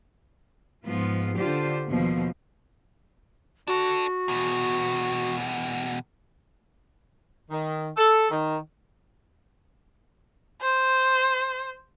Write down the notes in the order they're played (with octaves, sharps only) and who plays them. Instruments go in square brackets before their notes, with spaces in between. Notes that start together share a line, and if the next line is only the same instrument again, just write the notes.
[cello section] G#2 F3 B3 F4
D3 F4 G4 C5 D5
D#2 B2 F3
[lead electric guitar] D4 A4 [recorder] F#4
[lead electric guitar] E2 B2
[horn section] D#3
A4
D#3
[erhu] C5